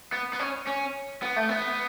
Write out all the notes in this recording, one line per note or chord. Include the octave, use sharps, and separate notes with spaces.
B3
B3
C#4
C#4
B3
A3
B3